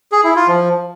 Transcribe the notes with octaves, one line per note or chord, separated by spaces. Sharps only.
G#4
E4
F4
F3